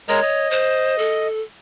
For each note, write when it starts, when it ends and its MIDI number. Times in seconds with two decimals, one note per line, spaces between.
0.09 0.20 56
0.09 0.20 70
0.09 0.48 73
0.09 0.20 75
0.22 1.28 75
0.51 0.98 72
0.99 1.41 69